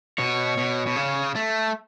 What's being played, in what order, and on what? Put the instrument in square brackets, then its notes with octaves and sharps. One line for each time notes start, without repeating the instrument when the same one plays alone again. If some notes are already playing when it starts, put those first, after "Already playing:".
[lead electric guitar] B2 [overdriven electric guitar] C#5
[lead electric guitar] B2
B2
C#3
A3